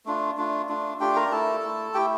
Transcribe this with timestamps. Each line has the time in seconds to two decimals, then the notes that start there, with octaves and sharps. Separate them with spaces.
0.05 A3 D4 F4
0.37 A3 D4 F4
0.69 A3 D4 F4
1.00 A3 D4 F4 G4 G5
1.16 A#4 A#5
1.31 A3 E4 A4 A5
1.63 A3 E4
1.94 A3 E4 G4 G5